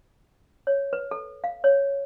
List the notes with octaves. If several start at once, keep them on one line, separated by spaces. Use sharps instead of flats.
C#5
B4
A4
F5
C#5